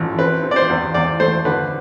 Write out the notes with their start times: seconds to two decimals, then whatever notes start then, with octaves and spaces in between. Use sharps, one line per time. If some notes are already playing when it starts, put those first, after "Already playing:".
Already playing: A1 F3
0.19 C4 B4
0.43 C4
0.51 D5
0.56 C5
0.70 E2
0.94 E2 D5
1.20 A3 C5
1.45 D3 B4